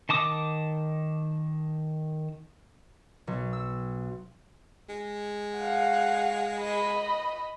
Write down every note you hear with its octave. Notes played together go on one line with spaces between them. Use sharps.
D#3 A5 D6 D#6
B1
E6
G#3
F5 F#5
D#5 B5